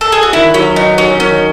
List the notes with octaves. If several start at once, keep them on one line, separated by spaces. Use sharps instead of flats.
A4
G#4
F#4
D#3 E4
F#3 C#4
B3 D#4
F#3 C#4
D#3 C#4